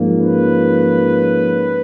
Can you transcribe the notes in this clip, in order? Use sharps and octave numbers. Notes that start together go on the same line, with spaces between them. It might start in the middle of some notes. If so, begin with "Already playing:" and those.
Already playing: G#2 F3 A#3 C#4
B4